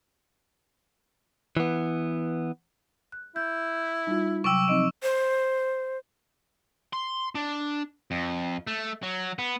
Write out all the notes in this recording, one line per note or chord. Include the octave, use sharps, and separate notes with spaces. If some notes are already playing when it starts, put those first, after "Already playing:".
E3 B3
F#6
E4 G6
G3 D#4 F4
C3 F#3 G5 C#6 D6 E6 D7
F3 C4 D#4 D#5 D7
C5
C6
D4
F2
A3
F#3
B3